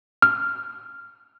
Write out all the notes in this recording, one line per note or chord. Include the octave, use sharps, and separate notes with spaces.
F6